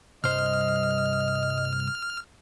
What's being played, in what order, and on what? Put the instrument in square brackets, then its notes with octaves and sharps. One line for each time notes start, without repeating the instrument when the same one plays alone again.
[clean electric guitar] C2 G2 C5 [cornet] D#5 [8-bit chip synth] F6